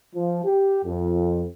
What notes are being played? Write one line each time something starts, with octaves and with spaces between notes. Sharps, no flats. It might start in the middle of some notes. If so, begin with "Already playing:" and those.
F3
G4
F2